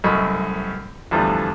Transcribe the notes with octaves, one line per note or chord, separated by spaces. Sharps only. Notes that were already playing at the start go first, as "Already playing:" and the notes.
C2 F#2 A3 D#5 B5 C#6
E2 D3 E3 F3 G3 A3